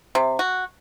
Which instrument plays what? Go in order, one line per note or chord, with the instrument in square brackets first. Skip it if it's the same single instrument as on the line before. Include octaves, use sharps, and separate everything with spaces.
[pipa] C3
F#4